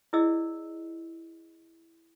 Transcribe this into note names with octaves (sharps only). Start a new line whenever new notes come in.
E4 G#4 D5 D#5 E6